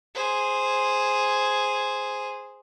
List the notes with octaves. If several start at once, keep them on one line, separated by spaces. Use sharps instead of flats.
G#4 C5